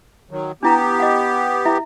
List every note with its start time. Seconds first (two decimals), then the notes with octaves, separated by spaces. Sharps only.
0.31 D#3 F#3
0.63 B3 D4 E4 G4 A#5
1.00 D#5 F#5
1.65 E4 E5